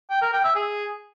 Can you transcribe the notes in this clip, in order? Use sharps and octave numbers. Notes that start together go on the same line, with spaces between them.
G5
A#4
G5
E5
G#4